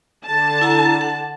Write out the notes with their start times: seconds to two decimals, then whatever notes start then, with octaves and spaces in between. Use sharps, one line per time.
0.25 D3 A5
0.61 E4 F#5 A#5
1.01 F#5